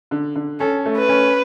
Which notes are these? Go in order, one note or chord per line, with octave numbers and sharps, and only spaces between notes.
D3
D3
C#4 A4
A3
B4
C#4